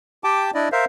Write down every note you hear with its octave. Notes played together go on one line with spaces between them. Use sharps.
G4 G5 A5 D6
D4 E4 D5 D#5
A#4 C5 E5 F5